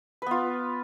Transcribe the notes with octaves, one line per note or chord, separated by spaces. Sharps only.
B3 F4 B4